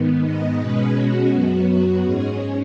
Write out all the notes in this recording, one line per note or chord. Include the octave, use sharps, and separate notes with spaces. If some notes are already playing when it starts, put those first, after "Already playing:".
Already playing: G#2 D#3 B3
D#5
B2 G#3 C#4 B4
F#4
F#2 F#3 B3 F#4
F#4
G#2 G#3 C#4 G#4